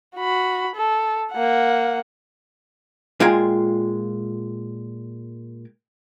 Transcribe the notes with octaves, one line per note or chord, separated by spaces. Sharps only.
F#4 B5
A4
A#3 F#5
A#2 G#3 F4 G5 G#5 A#5